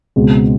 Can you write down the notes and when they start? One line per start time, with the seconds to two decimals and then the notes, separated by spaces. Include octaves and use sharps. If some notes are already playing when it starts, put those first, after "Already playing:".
0.16 C#2 B2 G#3 C4